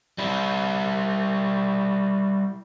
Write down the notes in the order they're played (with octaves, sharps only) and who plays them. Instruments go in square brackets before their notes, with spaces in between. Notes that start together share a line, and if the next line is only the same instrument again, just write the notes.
[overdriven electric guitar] G3 E4